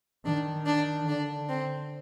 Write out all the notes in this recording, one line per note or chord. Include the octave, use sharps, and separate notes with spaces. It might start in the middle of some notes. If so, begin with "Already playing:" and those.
D#3 D4
D4
D3 D4
C4